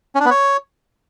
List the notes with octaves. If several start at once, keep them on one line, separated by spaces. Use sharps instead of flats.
C#4
D4
B3
C#5